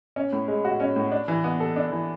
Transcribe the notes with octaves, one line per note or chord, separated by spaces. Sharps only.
C#4
A2
G#3
F#4
C#4
A2
D4
E3
B3
A4
D4
E3